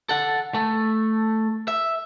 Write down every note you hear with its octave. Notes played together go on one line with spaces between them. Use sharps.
A4 F#5
A3 A4
E5